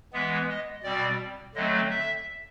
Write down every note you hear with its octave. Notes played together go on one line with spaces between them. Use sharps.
E3 G#3 B3 E5
D#5
B2 G3 C4 D5
D3 F#3 A3 C4 D#5
E5